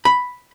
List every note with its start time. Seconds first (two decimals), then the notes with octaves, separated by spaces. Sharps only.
0.05 B5